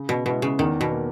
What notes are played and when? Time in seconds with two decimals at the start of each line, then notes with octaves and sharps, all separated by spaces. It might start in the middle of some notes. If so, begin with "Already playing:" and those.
Already playing: C#3
0.09 B2
0.25 B2 G#3 B3 E4
0.42 C#3
0.59 E2 D#3
0.81 B2
0.92 A#3